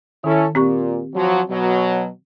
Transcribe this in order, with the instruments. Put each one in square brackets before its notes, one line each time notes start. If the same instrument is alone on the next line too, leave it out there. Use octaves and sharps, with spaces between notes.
[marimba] D#3 [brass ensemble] C#4 E4 A4
[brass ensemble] A#2 [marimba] C4 G4 C#6
[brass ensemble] F3 F#3
B2 F#3